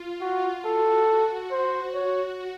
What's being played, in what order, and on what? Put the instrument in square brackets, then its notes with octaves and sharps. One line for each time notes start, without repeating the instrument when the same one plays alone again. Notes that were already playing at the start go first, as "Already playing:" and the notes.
Already playing: [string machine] F4
[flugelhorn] F#4
[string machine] F#4 [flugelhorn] A4
[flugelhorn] C5
C#5